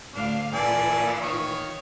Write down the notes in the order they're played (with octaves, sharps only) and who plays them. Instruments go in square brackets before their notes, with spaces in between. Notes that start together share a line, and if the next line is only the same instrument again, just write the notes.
[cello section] D2 A2 F5 [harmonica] D4
[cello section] A#2 E3 [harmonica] A4 D5 G#5
[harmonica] D#3 C#5